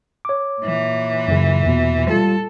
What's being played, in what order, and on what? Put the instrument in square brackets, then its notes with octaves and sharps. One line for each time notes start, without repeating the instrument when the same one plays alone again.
[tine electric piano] C#5 D6
[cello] A#2 E3
[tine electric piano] F#2 C#3
E2 B2
[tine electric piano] G3 F4 [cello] A4